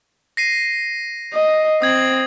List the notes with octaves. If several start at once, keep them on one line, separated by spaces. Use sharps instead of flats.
A#6 C7 D#7
D#5
C4 D#6 G#6 F#7